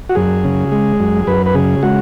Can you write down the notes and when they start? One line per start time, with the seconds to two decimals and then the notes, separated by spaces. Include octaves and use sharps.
0.09 F#4
0.15 F#2 G#4
0.44 C#3
0.72 G#3
1.00 F#2
1.27 F#2 B4
1.46 B4
1.55 C#3 G#4
1.83 G#3 F#4